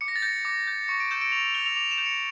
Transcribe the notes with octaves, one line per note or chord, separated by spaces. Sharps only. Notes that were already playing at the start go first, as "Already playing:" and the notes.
D6 C#7
A#6
A6
G6 A#6
D6
G6
C#6 C#7
D7
E6 G6 E7
D7
C#6 F7
F7
E6 G6 G7
F7
D6 F7
E7
G6
C#7